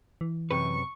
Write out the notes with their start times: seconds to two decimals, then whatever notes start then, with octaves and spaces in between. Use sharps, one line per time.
0.21 E3
0.51 F#2 C3 B4 C#6